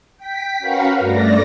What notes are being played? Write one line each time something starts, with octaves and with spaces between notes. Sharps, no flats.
G5 B6
C#4 F#4 A#4 B4 F5 F#5
G2 A3 D5 A#6